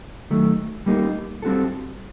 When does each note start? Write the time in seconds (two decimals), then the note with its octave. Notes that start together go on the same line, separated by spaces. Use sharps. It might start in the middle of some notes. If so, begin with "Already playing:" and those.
0.30 D#3 F#3 A3
0.86 G3 A#3 D#4
1.42 G3 C4 F#4 A4